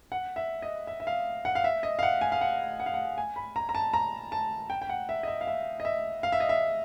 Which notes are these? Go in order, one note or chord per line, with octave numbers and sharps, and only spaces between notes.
F#5
E5
D#5
E5
E5
F5
F#5
F5
E5
D#5
F5
F#5
G#5
F5
F#5
F#5
F5
F#5
G#5
B5
A#5
A#5
A5
A#5
A5
G5
G5
F#5
E5
D#5
E5
F5
E5
D#5
E5
F5
E5
D#5
E5